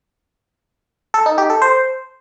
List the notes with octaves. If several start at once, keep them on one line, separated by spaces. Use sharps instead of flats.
A4
D#4
G4
A4
C5